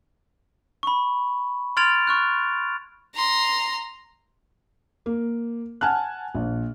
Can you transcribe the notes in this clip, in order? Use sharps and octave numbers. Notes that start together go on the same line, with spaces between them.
B5 C#6
C6 F6 G#6 A6 D7 F7
C#6 F6 F#6
A#5 C6
A#3
F#5 G#5 A5 F6 F#6
A#1